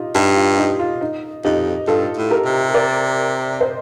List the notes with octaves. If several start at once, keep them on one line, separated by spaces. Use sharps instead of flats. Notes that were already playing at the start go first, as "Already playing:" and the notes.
Already playing: D#4 F4 G4
G2 D#4 G4
F4
D#4 G4
F4
D#4
F2 D#4 G4
G2 F4 A4
A2
G4 A#4
C3
A#4 D5
C5 D#5